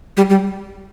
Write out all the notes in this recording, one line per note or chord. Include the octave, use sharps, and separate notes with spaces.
G3
G3